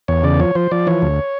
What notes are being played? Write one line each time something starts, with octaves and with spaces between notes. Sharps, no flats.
E2 C#5
C#3 D5
F3 C#5
F3 C5
F3 D5
E3 C#5
D2